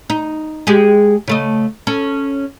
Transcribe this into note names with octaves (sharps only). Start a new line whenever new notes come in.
D#4
G#3 G4 G#4
C#3 A3 D#5
C#4 A4